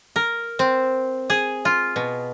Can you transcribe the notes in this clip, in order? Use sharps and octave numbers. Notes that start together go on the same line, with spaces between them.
A#4
C4
G#4
F4
B2